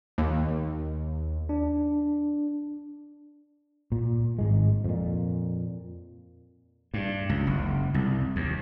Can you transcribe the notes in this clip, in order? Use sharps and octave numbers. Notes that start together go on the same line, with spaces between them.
D#2
D4
A#2
G#1 G#2 G#3
F2 A#2
G2
C#2
F#1
C2
D#2